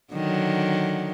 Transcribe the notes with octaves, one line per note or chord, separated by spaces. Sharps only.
D3 D#3 F#3